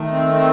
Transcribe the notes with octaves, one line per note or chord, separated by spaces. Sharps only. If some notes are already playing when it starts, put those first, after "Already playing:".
Already playing: D#3 A3
C4
C4